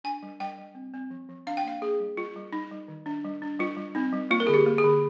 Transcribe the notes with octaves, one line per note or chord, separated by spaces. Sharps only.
D4 G#5
G3
G3 G5
G3
C4
C4
F3
F3
D4 F5
G5
A#3 F5
A#3 G#4
G3
G3 F4
G3
G3 D#4
G3
D#3
D4
G3
D4
G3 F4
G3
C4 D#4
G3
A#3 F4
A#4
D3 G#4
G4
A#3
G#4
D3